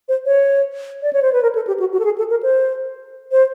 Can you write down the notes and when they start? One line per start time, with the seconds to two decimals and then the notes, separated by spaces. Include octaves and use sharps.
0.09 C5
0.26 C#5
1.02 D5
1.13 C#5
1.22 C5
1.33 B4
1.43 A#4
1.55 A4
1.67 G4
1.80 F#4
1.92 F#4
2.00 A4
2.05 G#4
2.18 A4
2.30 A#4
2.43 C5
3.32 C5